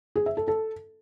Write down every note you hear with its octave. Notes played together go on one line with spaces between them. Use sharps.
G#4
E5
A4
A4